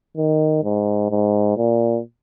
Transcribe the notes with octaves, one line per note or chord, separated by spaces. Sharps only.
D#3
G#2
G#2
A#2